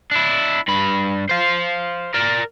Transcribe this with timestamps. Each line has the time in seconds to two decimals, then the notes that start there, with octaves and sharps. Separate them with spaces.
0.11 D4 E4
0.68 G2 B5
1.29 C5 F5
2.14 A#4 D5